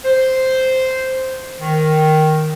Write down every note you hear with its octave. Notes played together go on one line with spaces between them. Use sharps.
C5
D#3